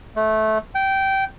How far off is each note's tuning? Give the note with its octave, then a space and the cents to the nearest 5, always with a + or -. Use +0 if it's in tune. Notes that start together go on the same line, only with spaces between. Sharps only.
A3 -15
G5 -15